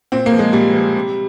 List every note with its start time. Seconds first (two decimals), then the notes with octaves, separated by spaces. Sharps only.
0.12 A#2 C4
0.26 A#3
0.32 F3
0.39 G#3
0.53 A#2 G3
0.74 F3
0.95 C3